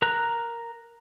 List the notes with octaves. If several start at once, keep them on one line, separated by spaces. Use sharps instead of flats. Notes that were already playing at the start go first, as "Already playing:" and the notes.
A#4 A#5 F#6